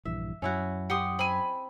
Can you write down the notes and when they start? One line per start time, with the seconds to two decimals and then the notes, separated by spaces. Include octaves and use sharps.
0.05 A#1 G2 E3 E5
0.42 F#2 C#4 E4 F#4
0.90 G4 F#5 C6 D#6
1.19 C4 G#5 B5